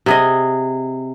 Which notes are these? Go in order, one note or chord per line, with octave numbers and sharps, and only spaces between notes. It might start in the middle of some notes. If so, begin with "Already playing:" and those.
C3 G#4 D#5